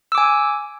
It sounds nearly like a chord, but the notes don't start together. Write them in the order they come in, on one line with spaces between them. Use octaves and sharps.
E6 D6 G#5